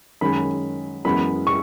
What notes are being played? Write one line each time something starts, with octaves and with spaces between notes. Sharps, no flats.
F#2 D#3 G#3 C#4 B5
F#2 E3 G#3 B3 B5
C#6